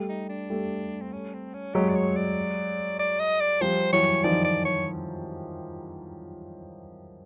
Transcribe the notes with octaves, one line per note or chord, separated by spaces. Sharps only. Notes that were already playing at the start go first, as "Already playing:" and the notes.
Already playing: G3 A3
D#4
D4
G3 A3
C4
C#4
C4
C#4
F#3 G#3 G4
D5
C#5
D5
D5
D#5
D5
F3 G3 C5
E3 F#3 C#5
D#3 F3 D5
D5
C#5